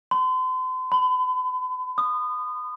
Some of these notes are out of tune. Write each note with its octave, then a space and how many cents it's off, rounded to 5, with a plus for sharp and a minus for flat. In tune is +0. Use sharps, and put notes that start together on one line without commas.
C6 -40
B5 +40
D#6 -20